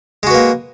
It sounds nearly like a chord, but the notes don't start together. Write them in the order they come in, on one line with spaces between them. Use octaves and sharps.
G#3 F#4 B4 A#3